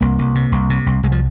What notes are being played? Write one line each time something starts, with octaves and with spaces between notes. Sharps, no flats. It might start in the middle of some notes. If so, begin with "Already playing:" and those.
C2 A#3
C2
C3
C2
C3
C2
C2 G#3
F3